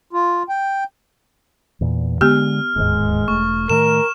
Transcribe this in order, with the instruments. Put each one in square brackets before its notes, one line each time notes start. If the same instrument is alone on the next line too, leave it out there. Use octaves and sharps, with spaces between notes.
[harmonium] F4
G5
[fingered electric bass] E2 A#2
[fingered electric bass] D3 G#3 [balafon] B3 G4 [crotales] F6
[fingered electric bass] D1 D#2 G#2 [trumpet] G#3
[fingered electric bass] E1 A3 [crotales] C#6
[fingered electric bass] A2 D#3 A3 [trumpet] A#4 [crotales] E7